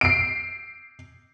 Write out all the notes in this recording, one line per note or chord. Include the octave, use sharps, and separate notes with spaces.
C7 D7